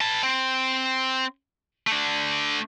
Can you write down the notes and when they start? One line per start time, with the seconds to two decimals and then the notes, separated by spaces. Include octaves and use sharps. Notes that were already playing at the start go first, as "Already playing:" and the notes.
0.01 B4 A5
0.23 C4
1.87 A3 D4